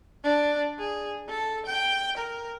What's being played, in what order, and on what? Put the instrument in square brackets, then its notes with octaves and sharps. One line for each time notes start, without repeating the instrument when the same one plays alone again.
[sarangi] D4
G#4
A4
G5
A#4